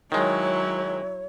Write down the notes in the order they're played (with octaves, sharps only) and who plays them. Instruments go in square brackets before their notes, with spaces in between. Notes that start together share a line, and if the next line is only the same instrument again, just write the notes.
[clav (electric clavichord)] D#3 G#3 [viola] F#3 E4 [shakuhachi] C#5